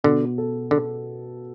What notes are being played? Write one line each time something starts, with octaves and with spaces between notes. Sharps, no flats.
B2 D3
A4
D3 A4